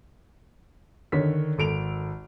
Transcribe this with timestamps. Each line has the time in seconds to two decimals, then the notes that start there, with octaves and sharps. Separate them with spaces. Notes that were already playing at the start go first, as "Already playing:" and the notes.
1.12 D3 D#3 C#5 B6
1.58 G#1 A4 D7 F7